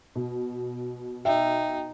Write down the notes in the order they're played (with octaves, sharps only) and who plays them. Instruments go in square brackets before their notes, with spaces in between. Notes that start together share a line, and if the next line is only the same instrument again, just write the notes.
[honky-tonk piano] B2
[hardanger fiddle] D#4 [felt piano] E5 [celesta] G5